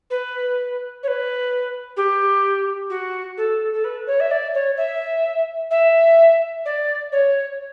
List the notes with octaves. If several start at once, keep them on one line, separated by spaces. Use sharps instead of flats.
B4
C#5
B4
G4
F#4
A4
A4
B4
C#5
E5
D5
C#5
E5
E5
D5
C#5